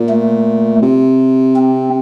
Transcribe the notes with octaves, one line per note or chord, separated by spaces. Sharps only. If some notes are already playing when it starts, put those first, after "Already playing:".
Already playing: A#2
A3
C3
C4